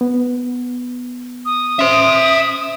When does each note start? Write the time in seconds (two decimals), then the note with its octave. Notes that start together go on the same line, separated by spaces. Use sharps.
0.01 B3
1.45 D#6
1.79 C#4 C5 E5 C6